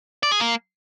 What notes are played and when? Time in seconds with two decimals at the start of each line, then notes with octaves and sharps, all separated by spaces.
0.23 D5
0.31 G#4
0.40 A#3